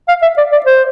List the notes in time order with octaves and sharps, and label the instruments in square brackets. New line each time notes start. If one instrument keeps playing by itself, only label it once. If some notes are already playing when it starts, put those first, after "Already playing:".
[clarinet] F5
E5
D5
D5
C5